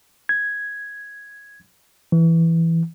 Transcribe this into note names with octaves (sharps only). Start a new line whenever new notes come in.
G#6
E3